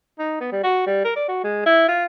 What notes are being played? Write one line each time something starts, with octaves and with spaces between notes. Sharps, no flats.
D#4
B3
G3
F#4
G3
A#4
D5
F#4
G#3
E4
F4